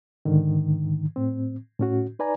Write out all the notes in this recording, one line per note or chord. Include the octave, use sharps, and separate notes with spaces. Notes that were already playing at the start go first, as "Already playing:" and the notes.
G#2 D3 D#3
A2 C4
A2 C#4 F#4
D#4 B4 D5 G#5 A#5